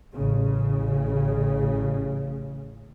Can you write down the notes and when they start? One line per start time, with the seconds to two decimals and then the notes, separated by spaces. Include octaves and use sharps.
0.11 A1 C#3